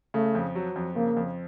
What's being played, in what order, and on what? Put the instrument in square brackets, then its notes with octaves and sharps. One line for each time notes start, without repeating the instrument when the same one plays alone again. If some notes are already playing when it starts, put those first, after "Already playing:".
[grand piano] C#3 [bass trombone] A3
[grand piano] F2
F#3
F2
[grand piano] C#3 [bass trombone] A#3
[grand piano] F2